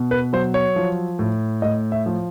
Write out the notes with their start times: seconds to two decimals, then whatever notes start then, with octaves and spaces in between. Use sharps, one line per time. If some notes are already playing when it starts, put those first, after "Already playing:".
Already playing: B2
0.11 B4
0.33 F#3 C5
0.54 C#5
0.76 F3
1.19 A2
1.62 A2 D#5
1.92 E5
2.06 F3